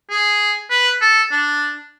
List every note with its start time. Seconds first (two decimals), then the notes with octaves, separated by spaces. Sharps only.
0.10 G#4
0.70 B4
1.01 A4
1.32 D4